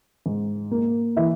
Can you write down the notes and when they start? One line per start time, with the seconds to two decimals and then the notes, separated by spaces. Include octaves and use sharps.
0.26 G#2
0.71 A#3
1.16 E3 E4 E5